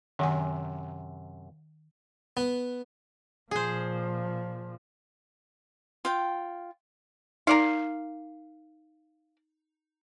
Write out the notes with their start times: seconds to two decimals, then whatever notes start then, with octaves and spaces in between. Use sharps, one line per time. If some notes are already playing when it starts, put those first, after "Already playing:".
0.19 F#2 C3 D#3 F#5 G#5
2.37 B3
3.51 A#2 F3 G#4 C5
6.05 F4 G5
7.47 D#4 A#4 D5 F5